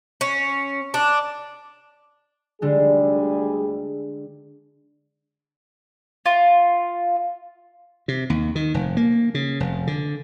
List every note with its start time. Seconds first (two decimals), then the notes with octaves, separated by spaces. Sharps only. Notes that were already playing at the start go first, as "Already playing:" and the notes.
0.21 C#4
0.94 D4
2.62 D2 D3 G3 G#3 G#4
6.26 F4
8.08 C3
8.30 D#2
8.55 D#3
8.74 F1
8.97 A#3
9.34 C#3
9.60 F1
9.87 D3